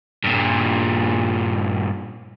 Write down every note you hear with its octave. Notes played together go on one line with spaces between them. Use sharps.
G2 A#2